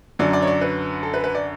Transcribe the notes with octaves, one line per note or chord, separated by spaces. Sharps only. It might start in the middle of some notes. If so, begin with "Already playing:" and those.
F#2 D3 F#3 D5
D5
C#5
D5
B4
A4
B4
B4
D5